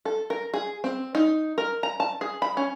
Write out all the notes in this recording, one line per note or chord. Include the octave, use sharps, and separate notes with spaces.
A4
A#4
G#4
C4
D#4
A#4
A#5
A5
G#4
B5
C#4